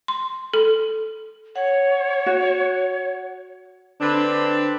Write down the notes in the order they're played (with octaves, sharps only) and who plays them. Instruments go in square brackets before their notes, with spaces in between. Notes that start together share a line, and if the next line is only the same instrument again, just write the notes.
[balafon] C6
A4
[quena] C#5 [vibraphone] F#5
[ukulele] F#4
[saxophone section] D3 C4 D4 B4